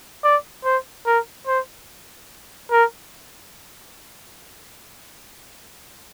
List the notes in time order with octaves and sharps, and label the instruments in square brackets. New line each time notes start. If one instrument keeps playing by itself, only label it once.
[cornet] D5
C5
A#4
C5
A#4